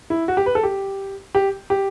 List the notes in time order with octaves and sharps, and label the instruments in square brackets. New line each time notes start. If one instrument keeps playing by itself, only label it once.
[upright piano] E4
F#4
G4
B4
A4
G4
G4
G4